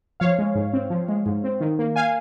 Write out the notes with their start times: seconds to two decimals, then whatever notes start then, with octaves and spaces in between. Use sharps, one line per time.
0.20 F3 C#5 F5
0.39 G#3
0.55 G#2
0.73 C4
0.90 F3
1.08 G#3
1.26 G#2
1.44 C4
1.60 D#3
1.79 A#3
1.96 F5 G#5